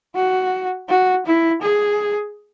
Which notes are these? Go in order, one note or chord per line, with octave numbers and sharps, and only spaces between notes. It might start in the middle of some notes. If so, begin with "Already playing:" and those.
F#4
F#4
E4
G#4